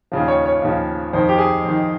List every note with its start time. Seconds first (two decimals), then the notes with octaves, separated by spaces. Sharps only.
0.12 D#2 C#3 F3
0.28 C#5
0.45 C#5
0.62 D#2 C#3 F3
1.13 F2 D#3 C5
1.29 G4
1.38 G#4
1.64 F2 D#3